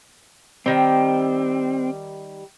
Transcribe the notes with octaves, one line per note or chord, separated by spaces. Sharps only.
D#3 G3 C4